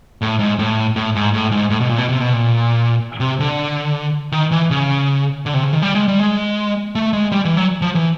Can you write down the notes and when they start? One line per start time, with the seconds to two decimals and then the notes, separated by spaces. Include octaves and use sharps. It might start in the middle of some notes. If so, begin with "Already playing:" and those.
0.22 A2
0.39 G#2
0.59 A2
0.96 A2
1.15 G#2
1.34 A2
1.52 G#2
1.70 A2
1.81 B2
1.90 A#2
1.98 B2
2.09 C3
2.21 B2
2.33 A#2
3.20 C3
3.40 D3
4.32 D#3
4.52 E3
4.71 C#3
5.46 D3
5.54 C3
5.63 C#3
5.73 D#3
5.82 G3
5.95 G#3
6.08 G3
6.19 G#3
6.95 A3
7.13 G#3
7.32 G3
7.45 E3
7.57 F#3
7.82 F3
7.95 E3